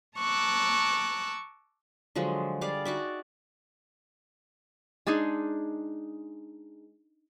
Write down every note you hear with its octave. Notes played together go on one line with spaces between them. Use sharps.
A5 A#5 C#6 D6 E6 F#6
D3 F3 F#3 G#3
G3 G#4 D5 F5
D#4 F#4 D5 E5
G#3 D4 D#4 G#4